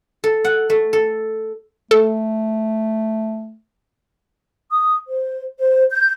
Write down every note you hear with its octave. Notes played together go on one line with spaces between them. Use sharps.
A4
F#5
A3
A4
A3 A4
D#6
C5
C5
G6